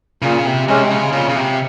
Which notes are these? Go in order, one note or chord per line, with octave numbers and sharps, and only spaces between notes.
A#2 C#3
C3
C3 G#3 C#4
C#3
A#2 C#3
C#3
C3